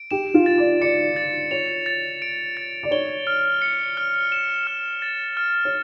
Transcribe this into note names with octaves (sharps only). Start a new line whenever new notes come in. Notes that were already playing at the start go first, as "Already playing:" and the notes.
Already playing: D7
G4 E7
F4
A6
D5
D5 C#7
A6
C#5 F7
A6
D7
A6
D5
C#5 G7
F6
C#7
F6
E7
F6
A6
F6
C#5